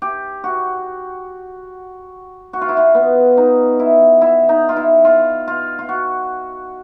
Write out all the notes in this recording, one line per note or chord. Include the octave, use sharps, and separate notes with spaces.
G4
F#4
F#4
F4
E4
F4
B3
D#4
E4
E4
D#4
F4
E4
F4
F4
F4
F#4